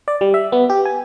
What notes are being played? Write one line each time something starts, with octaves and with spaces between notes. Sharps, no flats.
D5
G3
E5
B3
G4
G#5